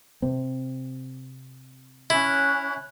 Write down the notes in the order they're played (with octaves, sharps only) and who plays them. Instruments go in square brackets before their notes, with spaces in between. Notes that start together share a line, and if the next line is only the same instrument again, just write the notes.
[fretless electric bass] C3 C4
[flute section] C#4 F#6 [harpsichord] E4